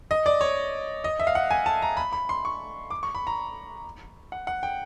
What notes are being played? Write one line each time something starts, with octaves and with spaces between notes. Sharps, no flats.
D#5
D5
C#5
D#5
E5
F5
F#5
G#5
A5
A#5
B5
B5
C6
C#6
D6
C#6
B5
A#5
F#5
F#5
G5